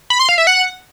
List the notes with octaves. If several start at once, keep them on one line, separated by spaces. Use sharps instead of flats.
B5
C6
F5
E5
F#5